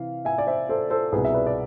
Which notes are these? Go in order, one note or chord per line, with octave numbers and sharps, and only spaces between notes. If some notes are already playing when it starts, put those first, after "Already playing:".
Already playing: C3 E3 F5
E5 G#5
D5
C5 E5
A4 C5
A4 C5
C2 B2 G#4 B4
E5
B4 D5
D5